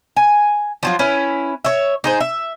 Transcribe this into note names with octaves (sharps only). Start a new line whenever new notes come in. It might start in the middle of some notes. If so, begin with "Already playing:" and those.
G#5
F3 F#3 F4
C#4 E4 B4
C#5 E5
D#4 G#4 C5
E5